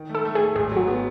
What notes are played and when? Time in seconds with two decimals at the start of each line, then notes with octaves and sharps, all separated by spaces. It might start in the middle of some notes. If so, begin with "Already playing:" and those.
Already playing: D#3
0.09 A3
0.14 A4
0.25 A3
0.35 A3 G#4
0.55 G#1 G#4
0.71 F#3 F#4
0.87 B3